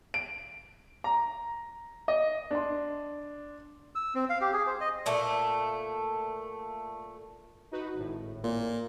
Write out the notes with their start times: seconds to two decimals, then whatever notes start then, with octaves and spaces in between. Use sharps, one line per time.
0.14 D7
1.04 A#5
2.08 D#5
2.51 D4 C6
3.95 E6
4.15 C4
4.29 F5
4.41 G4
4.53 G#4
4.67 C5
4.80 D#5
5.06 A#2 A3
7.71 D#4 F#4 B4
7.95 G#1 A2
8.44 A#2